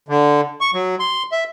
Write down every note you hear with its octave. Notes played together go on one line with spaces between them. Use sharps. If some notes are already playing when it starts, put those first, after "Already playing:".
D3
C#6
F#3
C6
E5